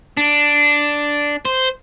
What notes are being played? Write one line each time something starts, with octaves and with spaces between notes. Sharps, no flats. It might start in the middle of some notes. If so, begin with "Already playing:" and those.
D4
C5